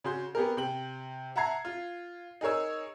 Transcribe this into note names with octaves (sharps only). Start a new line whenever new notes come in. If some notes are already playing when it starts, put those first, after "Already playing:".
C#3 F#4 C6 G6
B3 G4 G#4 A#4
C3 G5 F#7
E5 F#5 A5 A#5 G#6 C7
F4
D#4 G#4 A#4 C#5 E6